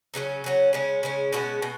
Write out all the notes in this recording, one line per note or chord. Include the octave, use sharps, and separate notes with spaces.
C#3 F#3 C#4 D#4
C#3 F#3 C#4
C#3 G#3 C#4
C#3 G#3 C#4
B2 G#3 C#4 F#4
B2